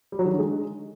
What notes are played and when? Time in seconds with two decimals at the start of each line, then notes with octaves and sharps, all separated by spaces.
0.12 G3
0.19 F#3
0.26 D#3
0.32 D3
0.39 G#3